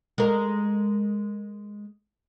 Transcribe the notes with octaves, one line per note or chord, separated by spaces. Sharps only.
G#3 A#4